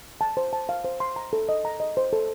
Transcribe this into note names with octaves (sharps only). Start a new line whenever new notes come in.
A5
C5
A5
F5
C5
C6
A#5
A4
D#5
A#5
D#5
C5
A4